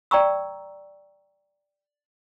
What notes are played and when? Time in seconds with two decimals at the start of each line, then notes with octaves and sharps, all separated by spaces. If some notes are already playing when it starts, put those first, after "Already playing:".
0.11 D5 G5 A#5 C#6 E6